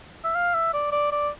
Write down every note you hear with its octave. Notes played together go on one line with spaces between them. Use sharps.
E5
F5
E5
D5
D5
D5